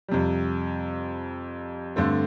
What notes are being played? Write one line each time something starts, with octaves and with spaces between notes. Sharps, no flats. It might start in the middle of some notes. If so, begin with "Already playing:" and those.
F2 C3 G3
G2 D3 A3 C4